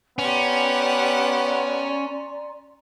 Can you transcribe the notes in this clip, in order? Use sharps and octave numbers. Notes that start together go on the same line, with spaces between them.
B3 C#4 G4 D5 F#5 A#5 C6